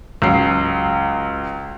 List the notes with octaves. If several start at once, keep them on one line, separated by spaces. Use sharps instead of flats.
C#2 F#3 C7